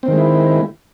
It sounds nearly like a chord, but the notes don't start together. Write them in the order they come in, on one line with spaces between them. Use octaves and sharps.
C4 D#3 G#3 E4